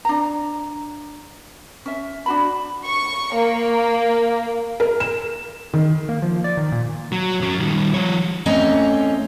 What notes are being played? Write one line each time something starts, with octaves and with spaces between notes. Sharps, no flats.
D4 A#5
C#4 E5
D4 F#4 B5
C#6
A#3
A#4
E7
D#3
A#3
F3
D5
D#3
A#2
F#3
F#2 F#3
D#3 G3
F3 C#5
E2 A3 C4 C#4 D#5 A#5